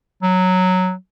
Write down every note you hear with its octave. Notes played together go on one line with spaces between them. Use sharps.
F#3